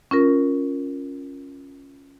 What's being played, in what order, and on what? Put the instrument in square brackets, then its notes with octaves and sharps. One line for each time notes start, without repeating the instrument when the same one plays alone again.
[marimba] C#4 F4 A#4